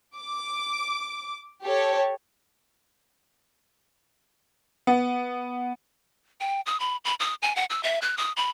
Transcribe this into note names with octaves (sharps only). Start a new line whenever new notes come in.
D6
G4 A4 C#5
B3
G5
D#6
B5
B5
D#6
G#5
F#5
E6
E5
F#6
D#6
B5